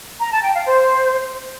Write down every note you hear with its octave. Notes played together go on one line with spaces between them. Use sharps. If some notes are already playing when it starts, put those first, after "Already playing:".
A#5
A5
G5
F5
C5